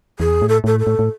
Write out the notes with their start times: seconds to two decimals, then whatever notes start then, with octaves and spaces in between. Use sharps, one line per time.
0.19 E2 G#4
0.42 A2
0.49 A4
0.64 A2 A4
0.79 A4
0.87 A2
0.99 A2